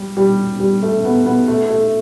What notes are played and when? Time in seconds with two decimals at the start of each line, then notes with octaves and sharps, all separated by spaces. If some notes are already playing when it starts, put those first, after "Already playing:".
Already playing: G3
0.17 G3
0.60 G3
0.83 A3
1.05 B3
1.26 B3
1.48 A3
1.70 A3